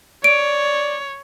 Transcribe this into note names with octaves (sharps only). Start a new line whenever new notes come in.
C#5 D5 D7